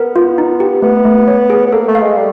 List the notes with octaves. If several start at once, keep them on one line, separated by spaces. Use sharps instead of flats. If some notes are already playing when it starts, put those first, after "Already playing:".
Already playing: B3 A#4
F4
D#4
G4
A3 B3
A3
C#5
G#4
B3
A#3 A4
A3
F5
G#3
G3